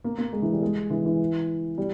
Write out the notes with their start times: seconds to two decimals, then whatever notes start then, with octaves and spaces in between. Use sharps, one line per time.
0.04 A#3
0.18 A#3
0.33 G#3
0.42 E3
0.52 G3
0.62 G#3
0.90 E3
1.06 E3
1.78 G3